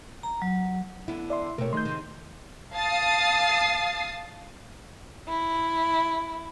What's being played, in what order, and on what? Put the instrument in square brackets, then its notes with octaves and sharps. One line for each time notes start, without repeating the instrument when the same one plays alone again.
[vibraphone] A#5
F#3
[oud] D3 B3 [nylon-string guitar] E4
[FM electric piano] D5 E5 C6
[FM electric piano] B2 [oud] A3 G4 [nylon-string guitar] A#4 C#5
[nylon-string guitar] D#3 G#3 [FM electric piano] C6 G6
[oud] C3
[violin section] F5 A5 D#6 A6 C7
[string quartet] E4